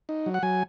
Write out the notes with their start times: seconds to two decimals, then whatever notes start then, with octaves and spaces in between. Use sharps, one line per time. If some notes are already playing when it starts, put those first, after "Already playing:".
0.09 D#4
0.26 F#3
0.34 F#5
0.43 F#3 G#5